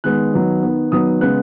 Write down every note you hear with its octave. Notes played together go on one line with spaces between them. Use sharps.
D#3 G#3 B3 F#6
D#3 F#3 B3
D#3 B3
D#3 F#3 B3 D#6
C#3 G#3 B3 F#6